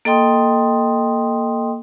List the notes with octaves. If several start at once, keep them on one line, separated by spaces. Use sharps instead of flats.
A#3 A4 D#5 G5 C6 D#6